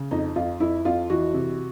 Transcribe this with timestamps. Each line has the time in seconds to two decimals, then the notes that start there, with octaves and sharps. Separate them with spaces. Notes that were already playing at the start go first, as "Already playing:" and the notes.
Already playing: C#3
0.11 F2 D#4
0.36 F2 F4
0.60 F2 E4
0.85 F2 F4
1.10 E3 F#4
1.34 C3